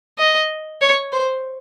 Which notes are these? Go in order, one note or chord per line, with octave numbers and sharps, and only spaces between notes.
D#5
C#5
C5